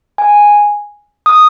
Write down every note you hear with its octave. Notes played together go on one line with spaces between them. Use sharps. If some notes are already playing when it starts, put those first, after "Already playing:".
G#5
D#6